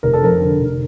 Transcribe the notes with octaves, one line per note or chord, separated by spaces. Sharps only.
F1 A#4
A4
F2 A#4
D3
F1